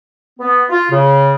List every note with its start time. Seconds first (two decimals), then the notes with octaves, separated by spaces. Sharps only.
0.39 B3
0.69 F4
0.90 C#3